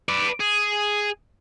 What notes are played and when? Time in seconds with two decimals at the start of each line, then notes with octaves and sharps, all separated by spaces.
0.09 B4 D5
0.40 G#4